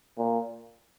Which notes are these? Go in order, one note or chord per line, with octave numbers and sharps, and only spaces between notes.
A#2